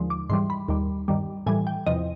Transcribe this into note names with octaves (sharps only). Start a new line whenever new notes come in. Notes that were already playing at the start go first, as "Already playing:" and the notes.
Already playing: D#2 D3 F3 G#3
D6
G#2 E3 G3 C6
B5
D#2 D#3 G3
G2 D#3 G3
A2 E3 G3 G#5
G5
E2 C3 F3 D#5